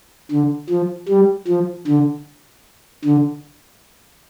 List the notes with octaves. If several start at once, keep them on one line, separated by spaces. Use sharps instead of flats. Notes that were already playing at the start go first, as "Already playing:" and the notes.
D3
F3
G3
F3
D3
D3